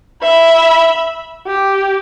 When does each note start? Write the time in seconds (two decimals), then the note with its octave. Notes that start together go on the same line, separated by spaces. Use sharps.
0.23 E5 B5
1.47 G4